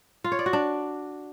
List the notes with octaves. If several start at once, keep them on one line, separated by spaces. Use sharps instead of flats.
F4
C#5
D5
F#4
D4